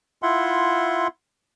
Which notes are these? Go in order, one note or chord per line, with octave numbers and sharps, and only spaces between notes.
E4 F4 E5 F#5 C6